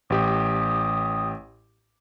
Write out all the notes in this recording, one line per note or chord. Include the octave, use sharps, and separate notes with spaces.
A1 G4 D#6